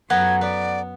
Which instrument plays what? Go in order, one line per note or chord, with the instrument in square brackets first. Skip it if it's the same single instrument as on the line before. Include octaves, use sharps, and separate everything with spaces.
[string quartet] F#2 [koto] B3 [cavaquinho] A4 F#5 A#5 [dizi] G#6
[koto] B3 [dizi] D5